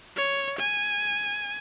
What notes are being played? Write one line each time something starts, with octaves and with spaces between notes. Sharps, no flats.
C#5
G#5